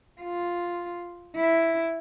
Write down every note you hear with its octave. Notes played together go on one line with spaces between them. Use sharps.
F4
E4